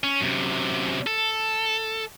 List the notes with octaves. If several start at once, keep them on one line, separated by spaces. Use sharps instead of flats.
C#4
F#2 C3
A4